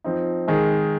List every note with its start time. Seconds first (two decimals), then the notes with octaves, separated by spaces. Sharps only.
0.04 F3 C4 D#4
0.48 D#3 G#3 D#4 G#4